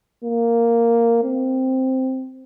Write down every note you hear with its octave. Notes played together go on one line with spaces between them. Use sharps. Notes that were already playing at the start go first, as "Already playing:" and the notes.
A#3
C4